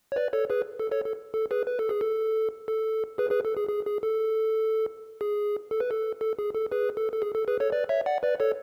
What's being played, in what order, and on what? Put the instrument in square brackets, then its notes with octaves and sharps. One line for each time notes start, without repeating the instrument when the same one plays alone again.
[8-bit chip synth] C#5
B4 D5
A4 C#5
G#4 B4
A4
A4 C#5
A4
A4
G#4 B4
B4
A4
G#4
A4
A4
G#4 B4
G#4 B4
A4
G#4
G#4
G#4
A4
G#4
A4
B4
A4
A4
G#4
A4
G#4 B4
A4
A4
G#4
A4
G#4 B4
A4 C#5
B4 D5
C#5 E5
D5 F#5
B4 D5
A4 C#5